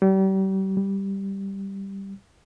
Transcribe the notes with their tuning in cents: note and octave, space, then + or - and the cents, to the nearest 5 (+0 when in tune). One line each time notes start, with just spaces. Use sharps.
G3 -35
G3 +0